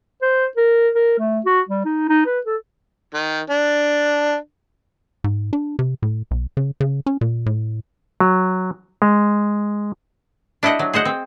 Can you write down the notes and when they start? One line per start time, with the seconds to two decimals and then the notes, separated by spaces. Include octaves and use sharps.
0.22 C5
0.57 A#4
0.95 A#4
1.19 A3
1.46 F#4
1.69 G3
1.85 D#4
2.10 D#4
2.26 B4
2.46 A4
3.14 D#3
3.50 D4
5.24 G#2
5.53 D4
5.79 C3
6.02 A2
6.31 B1
6.57 C#3
6.80 C#3
7.06 C#4
7.21 A#2
7.46 A2
8.20 F#3
9.02 G#3
10.63 D4 E4 G4 D#5 F#5
10.79 F#3
10.93 G#4 C5 D#5 F#5
11.05 C4